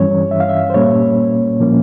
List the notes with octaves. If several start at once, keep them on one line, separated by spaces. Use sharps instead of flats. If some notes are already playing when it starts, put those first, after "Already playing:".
Already playing: G2 E3 G3 C#4 C#5
E5
F5
E5
C5
A#2 G3 A#3 C#4 C#5
A#2 F3 A#3 C#4